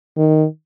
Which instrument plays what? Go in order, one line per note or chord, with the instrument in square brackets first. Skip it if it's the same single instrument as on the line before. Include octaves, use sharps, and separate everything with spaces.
[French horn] D#3